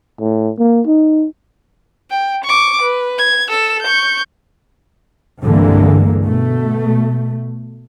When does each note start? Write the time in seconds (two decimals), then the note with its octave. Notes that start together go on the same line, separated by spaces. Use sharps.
0.20 A2
0.58 A#3
0.87 D#4
2.11 G5
2.44 C#6 D6
2.81 B4
3.18 G#6
3.49 A4 E6
3.82 C#6 G6
5.42 C2 G2 D3 E3 G#3 A#3
6.24 B2 A3